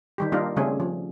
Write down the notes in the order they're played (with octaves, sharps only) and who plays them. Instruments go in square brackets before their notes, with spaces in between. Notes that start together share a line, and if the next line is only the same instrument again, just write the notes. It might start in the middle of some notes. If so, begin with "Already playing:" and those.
[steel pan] D#3 G3 G4
G3 A#3 D4 D#4 F4 A#4
C#3 G3 A3 C4 C#4 G#4
F3